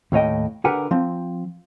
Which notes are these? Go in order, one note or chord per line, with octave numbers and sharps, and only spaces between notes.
D#2 A2 C#5 D#5 G5
D3 G4 A#4 B4 F#5 G#5
F3 C4